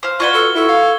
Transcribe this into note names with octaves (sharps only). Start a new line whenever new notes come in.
C5 F5
F4 F#4 B4 D5 C#6 G#6 G7
A4
E4 A4
F5